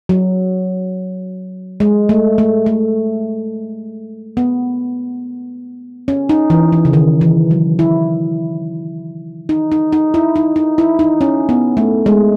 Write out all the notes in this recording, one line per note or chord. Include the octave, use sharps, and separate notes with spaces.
F#3
G#3
A3
A3
A3
B3
C#4
D#4
E3
E3
C#3
D#3
E3
F#3
E4
D#4
D#4
D#4
E4
D#4
D#4
E4
D#4
C#4
B3
A3
G#3